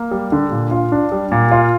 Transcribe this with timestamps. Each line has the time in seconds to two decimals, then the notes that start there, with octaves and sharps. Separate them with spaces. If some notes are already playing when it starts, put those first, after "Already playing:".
Already playing: A#3
0.11 G3
0.32 D3
0.51 A#2
0.71 F4
0.92 D4
1.12 G3
1.32 A#2
1.51 F4